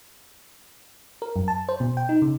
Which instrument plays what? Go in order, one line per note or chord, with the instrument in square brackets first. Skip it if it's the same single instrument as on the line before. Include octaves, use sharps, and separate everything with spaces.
[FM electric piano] A#4
F#2
A5
C5
B2
G5
D#4
C#3